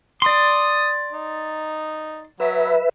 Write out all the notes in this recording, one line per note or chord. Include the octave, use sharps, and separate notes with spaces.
D5 C6 D#6
D#4
F#3 B4 E5